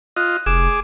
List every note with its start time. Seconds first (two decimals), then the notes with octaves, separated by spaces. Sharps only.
0.17 F4 D#5 F#6
0.46 F1 G#4 D6 E7